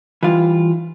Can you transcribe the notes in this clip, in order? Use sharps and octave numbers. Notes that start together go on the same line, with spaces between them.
E3 G3 F4